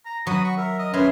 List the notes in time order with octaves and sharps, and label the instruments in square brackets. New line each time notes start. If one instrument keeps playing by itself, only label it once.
[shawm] A#5
[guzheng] F#3 [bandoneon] F#4 B5 [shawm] D#6
[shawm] C#6
[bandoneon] A#4 [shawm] E5
[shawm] D#5
[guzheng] B3 [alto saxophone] C#4 [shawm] G#4 [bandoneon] E5 C6 F6